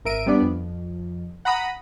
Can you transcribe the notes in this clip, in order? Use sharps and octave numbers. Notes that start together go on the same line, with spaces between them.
G#1 A#4 E5 D7 D#7
G3 B3 D4 D5
F2
F#5 A#5 B5 D#6